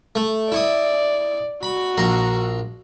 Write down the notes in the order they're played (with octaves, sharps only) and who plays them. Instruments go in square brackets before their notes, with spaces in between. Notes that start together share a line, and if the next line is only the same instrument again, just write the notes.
[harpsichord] A3
[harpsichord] E4 C#6 D#6 [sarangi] D5
[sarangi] F#4 [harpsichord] B5
[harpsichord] A#1 A#5 C6